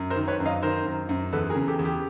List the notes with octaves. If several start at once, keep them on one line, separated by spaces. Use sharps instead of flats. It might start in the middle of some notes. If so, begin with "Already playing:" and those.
Already playing: F#2
A#4 C5
D#3
B4 C#5
F#2
D#5 F5
D#3 A#4 C5
F#2
F#2
E2 A4 B4
G#4 A#4
C#3
G4 A4
E2
G4